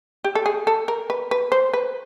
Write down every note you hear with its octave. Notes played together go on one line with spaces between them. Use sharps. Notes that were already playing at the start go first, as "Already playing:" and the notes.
G4
A4
G#4
A4
A#4
B4
B4
C5
B4